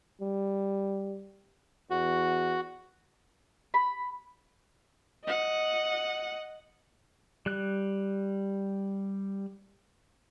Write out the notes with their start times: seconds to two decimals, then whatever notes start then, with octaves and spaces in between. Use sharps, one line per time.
0.21 G3
1.91 E2 F#4
3.74 B5
5.24 D#5 F#5
7.46 G3 F#6